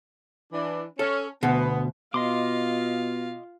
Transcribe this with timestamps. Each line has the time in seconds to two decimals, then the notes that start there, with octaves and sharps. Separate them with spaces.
0.53 E3 D4
0.99 C#4 A4
1.43 D2 B2 B3
2.14 B2 F4 D#5 F5 C6 D6